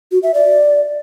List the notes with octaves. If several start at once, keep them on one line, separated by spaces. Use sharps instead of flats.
F#4
E5
D5